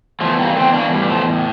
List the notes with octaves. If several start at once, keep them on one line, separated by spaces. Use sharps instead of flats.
E2 F3 A3
G3 A#3
E2 A3 C4
A#3 D4
A2 G3
A#3
F3 A3
A2